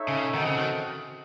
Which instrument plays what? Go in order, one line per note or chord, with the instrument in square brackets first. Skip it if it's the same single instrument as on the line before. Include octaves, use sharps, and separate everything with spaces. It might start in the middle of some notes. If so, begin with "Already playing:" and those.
Already playing: [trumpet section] D#4 A4 C#5 E5
[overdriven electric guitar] C#3
[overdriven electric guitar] D#3 [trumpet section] C4 F#4 A4 D#5 F#5
[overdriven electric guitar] C#3
D#3